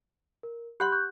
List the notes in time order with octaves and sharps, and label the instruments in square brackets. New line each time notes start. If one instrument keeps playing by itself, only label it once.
[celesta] A#4
[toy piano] G4 F#5 C6 [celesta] B5 F#6 G6
[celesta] C#6 F#6 G6